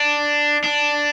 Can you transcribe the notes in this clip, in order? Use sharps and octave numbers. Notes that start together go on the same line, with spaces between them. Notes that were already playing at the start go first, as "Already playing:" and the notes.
Already playing: D4
D4